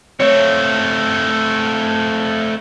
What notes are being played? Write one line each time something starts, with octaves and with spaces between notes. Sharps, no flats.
A3 C4 C#5